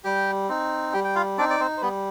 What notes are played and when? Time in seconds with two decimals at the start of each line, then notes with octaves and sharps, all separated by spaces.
0.04 G3 G4 G5
0.49 C4 D#4
0.93 G3 G4 G5
1.04 G5
1.16 F4 F5
1.38 C4 D4 D#4 D5
1.50 D5
1.60 C4 C5
1.77 C5
1.82 G3 B3 B4